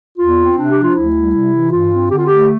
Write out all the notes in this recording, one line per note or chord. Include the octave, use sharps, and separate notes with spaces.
E2 F4
C4
C3 D4
F3 G4
F4
D2 E4
G3
C3
E3
G2 F4
C4
D3 G4
F4
A3 G4